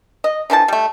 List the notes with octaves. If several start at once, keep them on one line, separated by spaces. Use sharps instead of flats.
D#5
D3 E3 F3 A5
G3 A3